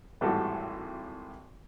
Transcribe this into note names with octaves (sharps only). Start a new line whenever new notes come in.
G#1 A2 E3 G3 F#4 A4